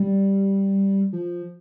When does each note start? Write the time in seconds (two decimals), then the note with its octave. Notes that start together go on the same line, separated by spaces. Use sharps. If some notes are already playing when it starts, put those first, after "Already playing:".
Already playing: G3
1.13 F3